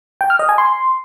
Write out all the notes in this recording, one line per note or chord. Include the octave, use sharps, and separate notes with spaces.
G5
F6
D#5
G#5
C6